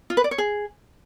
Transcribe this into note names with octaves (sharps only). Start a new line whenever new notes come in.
F4
B4
D5
C#5
G#4